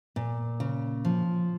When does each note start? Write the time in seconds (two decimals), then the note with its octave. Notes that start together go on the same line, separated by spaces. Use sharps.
0.16 A#2
0.60 C#3
1.05 F3